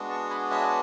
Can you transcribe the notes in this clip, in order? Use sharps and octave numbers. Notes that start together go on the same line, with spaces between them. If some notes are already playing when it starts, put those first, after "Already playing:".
Already playing: G#3 B3 D4 F#4
A5 C#6
G#5 B5
D5
C#5 E5